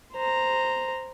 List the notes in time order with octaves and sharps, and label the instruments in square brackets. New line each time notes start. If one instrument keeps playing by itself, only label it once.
[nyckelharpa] C5 A#5